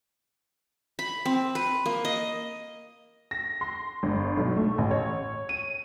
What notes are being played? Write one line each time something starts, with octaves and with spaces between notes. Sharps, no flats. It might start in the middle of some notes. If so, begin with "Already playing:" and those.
B5
C4
B4
A#3
D#5
A#6
C6
G1
B1
A3
A1
C#5
D#7